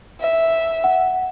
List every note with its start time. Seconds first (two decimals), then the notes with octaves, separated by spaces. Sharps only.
0.21 E5
0.84 F#5